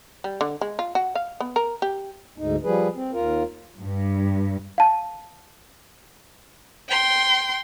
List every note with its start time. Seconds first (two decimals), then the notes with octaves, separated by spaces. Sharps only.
0.24 G3
0.41 D3
0.61 G#3
0.79 F4
0.95 F#4
1.15 F5
1.40 B3
1.56 A#4
1.82 G4
2.38 D2 G#2 D#4
2.64 F3 G3 G#4 B4
2.96 C4
3.13 D#2 F4 A#4
3.79 G2
4.78 F5 A5
6.88 G5 C6